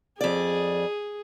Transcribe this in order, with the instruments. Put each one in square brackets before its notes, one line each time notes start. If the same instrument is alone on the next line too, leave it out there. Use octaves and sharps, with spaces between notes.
[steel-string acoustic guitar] F2 D5 [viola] G#4